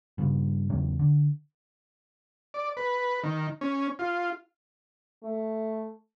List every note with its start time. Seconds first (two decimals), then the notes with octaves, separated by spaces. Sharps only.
0.18 G2 C#3
0.70 E2 C#3 E3 F#3
0.99 D3
2.54 D5
2.77 B4
3.23 D#3
3.61 C#4
3.99 F4
5.24 A3